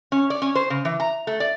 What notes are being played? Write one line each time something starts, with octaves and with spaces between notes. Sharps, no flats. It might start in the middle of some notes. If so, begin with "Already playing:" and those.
C#4
D5
C#4
C5
C#3
E3
A#5
A3
D5